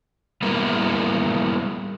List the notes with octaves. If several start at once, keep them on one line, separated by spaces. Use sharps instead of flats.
G3 A#3 B3 E4 G#4 A#4